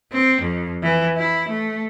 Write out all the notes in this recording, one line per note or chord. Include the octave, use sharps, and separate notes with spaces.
C4
F2
E3
E4
A3